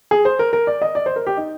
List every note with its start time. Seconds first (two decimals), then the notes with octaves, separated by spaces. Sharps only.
0.11 G#4
0.25 C5
0.39 A#4
0.53 A#4
0.67 D5
0.82 D#5
0.95 D5
1.06 C5
1.16 A#4
1.27 G4
1.37 D#4